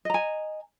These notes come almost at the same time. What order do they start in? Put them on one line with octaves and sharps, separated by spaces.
D#5 A#5 G#5